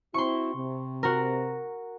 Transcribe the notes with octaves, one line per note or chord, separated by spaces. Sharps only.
C4 E4 F#4 C6 C#6
C3
F#4 A#4